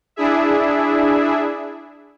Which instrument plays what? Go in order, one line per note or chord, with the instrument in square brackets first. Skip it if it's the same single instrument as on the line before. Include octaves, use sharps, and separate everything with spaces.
[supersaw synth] D4 E4 G#4 E5